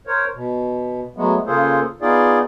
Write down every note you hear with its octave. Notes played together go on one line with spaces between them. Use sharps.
A#4 C5 C#5
B2
F#3 G#3 A3 B3
C#3 A#3 F4 G#4 A4 C5
B3 D#4 F4 G#4 D5